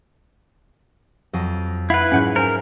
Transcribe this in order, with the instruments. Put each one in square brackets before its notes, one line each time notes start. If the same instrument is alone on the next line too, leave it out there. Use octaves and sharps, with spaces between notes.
[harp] F2 F#3 D#5
[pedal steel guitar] E4 B4 [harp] F5 F#5 [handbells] B5
[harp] G#2 F#3 [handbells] C#4 F#5 G6
[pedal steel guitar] A#4 [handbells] C5 G#5